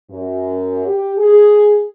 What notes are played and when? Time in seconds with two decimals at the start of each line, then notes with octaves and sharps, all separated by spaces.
0.11 F#2
0.86 G4
1.18 G#4